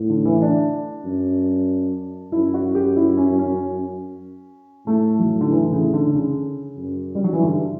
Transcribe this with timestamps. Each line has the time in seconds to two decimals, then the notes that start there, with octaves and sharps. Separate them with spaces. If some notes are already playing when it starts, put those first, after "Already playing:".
Already playing: A2
0.10 D3
0.25 E3
0.42 D4
1.05 F#2
2.32 F#2 E4
2.54 F#4
2.75 G4
2.96 E4
3.17 C#4
3.39 C#4
4.87 A2 A3
5.19 F#3
5.41 D3
5.51 E3
5.72 C#3
5.93 D3
6.15 C#3
6.78 F#2
7.15 G3
7.24 F#3
7.33 E3
7.41 G2 D3